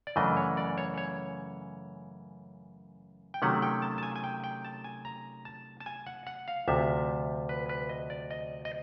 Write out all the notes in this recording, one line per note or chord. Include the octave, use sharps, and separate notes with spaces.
D5
F#2 C#3 E3 A3 D4 D#5
C#5
D5
C#5
C#5
G5
C3 D#3 F#3 A3 C#4 F#5
G5
A5
A5
G#5
G#5
G5
G5
A5
G#5
A#5
A5
A5
G#5
F#5
F#5
F5
D2 C3 F3 E5
B4
B4
D#5
D5
D#5
D#5